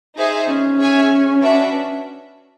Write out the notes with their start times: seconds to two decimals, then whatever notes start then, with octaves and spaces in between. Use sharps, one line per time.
0.16 D#4 G#4 C5 E5
0.47 C#4
0.79 G#4 C#5 E5 G#5
1.41 D4 F#4 B4 E5